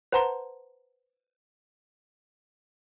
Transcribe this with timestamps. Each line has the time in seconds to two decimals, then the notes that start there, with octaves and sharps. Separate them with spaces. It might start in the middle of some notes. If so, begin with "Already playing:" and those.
0.12 B4 C5 F#5 A5 A#5 C6